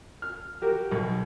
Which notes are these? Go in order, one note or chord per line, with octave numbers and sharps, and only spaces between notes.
F6
F#4 G4 A#4
B1